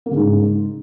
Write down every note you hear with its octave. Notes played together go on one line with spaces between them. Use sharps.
A#3
C#3
G#2